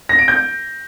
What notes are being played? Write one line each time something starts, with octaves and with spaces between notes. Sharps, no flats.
A#6
D7
G6